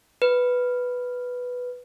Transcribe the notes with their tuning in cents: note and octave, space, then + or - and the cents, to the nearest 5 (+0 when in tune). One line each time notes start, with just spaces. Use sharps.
B4 +0